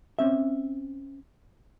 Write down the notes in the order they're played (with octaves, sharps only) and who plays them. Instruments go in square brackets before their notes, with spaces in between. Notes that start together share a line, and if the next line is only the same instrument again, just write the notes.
[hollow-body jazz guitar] C4 C#4 E5